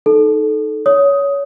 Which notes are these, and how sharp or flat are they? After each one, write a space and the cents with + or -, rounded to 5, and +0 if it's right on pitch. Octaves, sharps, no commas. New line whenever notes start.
D#4 +0 A4 -15
C#5 +20 D#6 +10